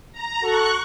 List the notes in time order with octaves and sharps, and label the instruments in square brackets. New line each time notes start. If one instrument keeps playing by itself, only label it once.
[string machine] A#5
[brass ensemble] F#4 A4 [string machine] C#6 F#6